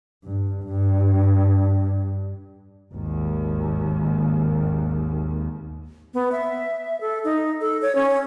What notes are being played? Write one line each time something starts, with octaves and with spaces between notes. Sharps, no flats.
G2
G2
G#1 D#2
B3
E5
A4
D#4
A4
C#5
C#4